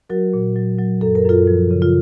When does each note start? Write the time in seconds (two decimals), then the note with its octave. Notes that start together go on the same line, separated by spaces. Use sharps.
0.10 F#3 F#4 A#4
0.33 A#2
0.56 F#3
0.78 F#3
1.01 F#2 A4
1.15 A#4
1.26 F#2 F4 A4
1.47 F3
1.71 C#3
1.82 F4